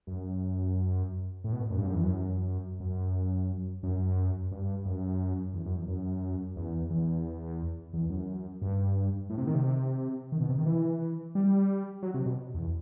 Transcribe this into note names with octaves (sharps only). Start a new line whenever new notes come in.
F#2
A2
B2
A2
F#2
G2
F#2
E2
F#2
F#2
F#2
G2
F#2
E2
F#2
E2
F#2
E2
E2
E2
F#2
G2
A2
C3
D#3
C3
D#3
B2
C3
D#3
E3
G3
F#3
C3
B2
E2